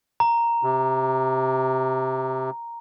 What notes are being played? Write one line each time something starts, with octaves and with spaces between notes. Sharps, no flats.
A#5
C3